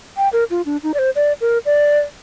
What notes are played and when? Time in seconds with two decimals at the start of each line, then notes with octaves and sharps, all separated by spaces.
0.17 G5
0.33 A#4
0.50 F4
0.66 D4
0.83 D#4
0.94 D5
0.99 C5
1.16 D5
1.41 A#4
1.66 D5